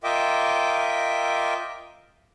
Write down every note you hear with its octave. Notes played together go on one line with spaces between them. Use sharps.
F4 A#4 D#5 E5 G5 D6